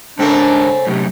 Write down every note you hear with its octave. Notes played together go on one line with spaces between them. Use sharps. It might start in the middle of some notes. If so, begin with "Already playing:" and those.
G#2 C#3 A3 C4 D4 A#4
F#2 A2 C3